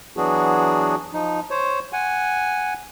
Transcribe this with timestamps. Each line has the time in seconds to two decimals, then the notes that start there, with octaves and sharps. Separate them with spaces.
0.17 E3 F#3 B3 D4 F#4 G#4
1.14 F3 D#4
1.51 C5 C#5
1.93 F#5 G#5